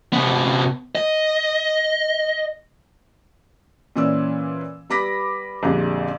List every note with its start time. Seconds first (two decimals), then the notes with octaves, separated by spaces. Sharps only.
0.13 C3 B3
0.95 D#5
3.96 A#2 E3 C#4 D5 E6
4.90 G3 B3 B5 D6 A#6 B6
5.63 A#1 F2 D3 G3 G#3